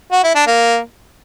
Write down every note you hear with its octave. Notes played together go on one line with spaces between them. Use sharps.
F#4
E4
D4
A#3